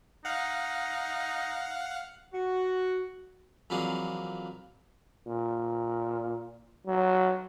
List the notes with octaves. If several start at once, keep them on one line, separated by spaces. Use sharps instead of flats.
D#4 F5 F#5
F#4
F2 E3 F#3 A#3 D4 G#4
A#2
F#3